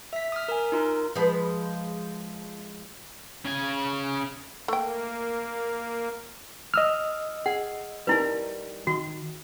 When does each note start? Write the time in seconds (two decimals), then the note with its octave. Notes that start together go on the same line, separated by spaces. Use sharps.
0.13 E5 B6
0.32 D#6 F6
0.48 A#4 G#5
0.72 D#4 F4 A#4
1.15 F3 G#3 B4
3.45 C#3 G#5
4.68 A3 A#3 G5
6.74 D#5 E6 F6
7.46 G#4 F#5
8.07 G3 D#4 E4 A#4 B4
8.87 D#3 F#4 C6